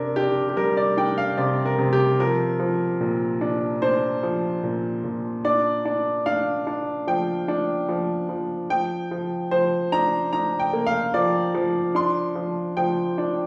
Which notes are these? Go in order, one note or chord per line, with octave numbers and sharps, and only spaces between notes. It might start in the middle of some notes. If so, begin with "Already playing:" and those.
Already playing: C3 D4 A#4
D4 G4
G4
G3 A#4
D5
D4 G5
F5
C3 D5
A#4
C3
G4
F3 A#4
F3
A#2
D4
D4 C5
F3
A#2
A#2
D4 D5
D4
D4 F5
D4
F3 G5
D4
F3
F3
F3 G5
F3
F3 C5
D4 A#5
D4 A#5
G5
A#3
F5
F3 D5
F3
D4 C6
F3
F3 G5
D4